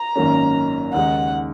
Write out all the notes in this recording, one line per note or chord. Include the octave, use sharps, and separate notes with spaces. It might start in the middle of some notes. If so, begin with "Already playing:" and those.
Already playing: A#5
G#1 F#2 D#3 A#3 C#4
D#2 C#3 G#3 D#4 F#5